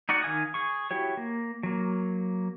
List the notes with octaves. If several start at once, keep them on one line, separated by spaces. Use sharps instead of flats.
D#4 F#4 D5 F#5
D#3 F5 G#5 D#6
G#4 C#6
E4 F#4 G4 C#5
A#3
F#3 A#3